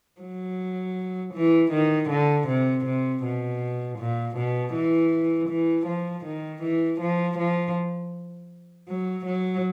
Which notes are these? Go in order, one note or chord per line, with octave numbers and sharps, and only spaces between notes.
F#3
E3
D#3
D3
C3
C3
B2
A#2
B2
E3
E3
F3
D#3
E3
F3
F3
F#3
F#3